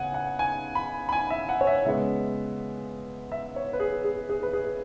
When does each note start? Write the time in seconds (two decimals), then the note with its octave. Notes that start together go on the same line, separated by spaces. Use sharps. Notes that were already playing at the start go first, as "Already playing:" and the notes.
Already playing: C#3 B3 F#5 G#5
0.14 F#5
0.39 G#5
0.75 B5
1.09 B5
1.13 G#5
1.30 E5
1.49 F#5
1.61 C#5
1.67 E5
1.85 C#3 G#3 B3 E5
3.32 E5
3.56 C#5
3.73 B4
3.80 G#4
4.05 G#4
4.29 G#4
4.43 B4
4.53 G#4